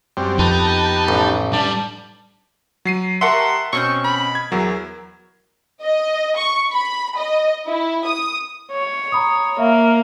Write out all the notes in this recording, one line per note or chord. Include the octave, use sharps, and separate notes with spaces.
F#2 G3 C4
F2 B3 D#4 G4 A5
A1
G3 D4 A5
F#3 C7 D#7
G4 A#4 E5 F#5 A5 C6 C#6
B2 C4 C#4 C#6 G6
B5
G#6
E2 F#3 E4 G#4 A#4
D#5
C#6
B5
D#5
E4
D#6
C#5
A#5 B5 D#6
A#3 E5 F5 A#5